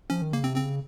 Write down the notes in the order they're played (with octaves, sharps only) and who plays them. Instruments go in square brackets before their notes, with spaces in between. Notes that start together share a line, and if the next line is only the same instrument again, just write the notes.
[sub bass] F3 [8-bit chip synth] C#4
[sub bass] D#3
[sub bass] C#3 [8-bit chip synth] A#3
[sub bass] C3 [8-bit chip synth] C4
[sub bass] C#3 [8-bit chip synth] C4